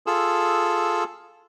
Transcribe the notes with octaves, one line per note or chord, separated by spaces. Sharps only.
F4 G#4 A4 E6